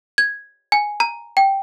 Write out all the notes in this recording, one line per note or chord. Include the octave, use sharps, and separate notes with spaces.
G#6
G#5
A#5
G5